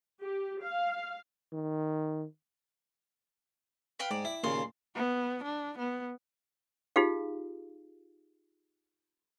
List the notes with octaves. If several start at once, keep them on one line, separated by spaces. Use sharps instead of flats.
G4
F5
D#3
B4 F5 G5
G#2 D5
E4
D#2 A#2 C#3 C6
B3
D4
B3
D#4 F4 G4 G#4 F5